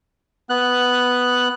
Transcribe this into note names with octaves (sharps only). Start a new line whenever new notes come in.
B3 F#6